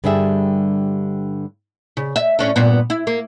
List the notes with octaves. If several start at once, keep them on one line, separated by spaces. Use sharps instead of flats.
G2 D3 G3 G#4 E5
C#3
E5
A2 C#4 D4
G2 A#2 B3
E4
A#3